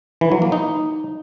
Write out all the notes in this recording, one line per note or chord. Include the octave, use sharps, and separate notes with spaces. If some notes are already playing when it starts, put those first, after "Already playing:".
E3
F#3
A#3
D#4